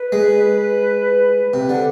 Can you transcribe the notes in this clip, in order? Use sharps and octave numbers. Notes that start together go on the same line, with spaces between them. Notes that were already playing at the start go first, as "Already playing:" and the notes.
Already playing: B4
G#3
C3
D3